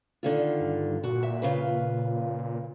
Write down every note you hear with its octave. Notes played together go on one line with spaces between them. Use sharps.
D3 D#3 F4
G2
A#2 F#4
E5
C#3 F4 B4